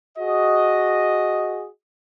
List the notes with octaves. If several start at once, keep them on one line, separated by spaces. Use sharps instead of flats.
F#4 G#4 D#5